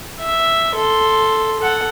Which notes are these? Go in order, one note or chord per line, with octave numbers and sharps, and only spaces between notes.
E5
A4 C6
A4 F#5